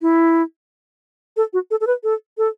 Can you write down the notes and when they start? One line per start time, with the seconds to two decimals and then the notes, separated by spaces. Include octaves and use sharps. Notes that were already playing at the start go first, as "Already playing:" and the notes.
0.02 E4
1.37 A4
1.53 F#4
1.71 A4
1.81 A4
1.87 B4
2.04 A4
2.38 A4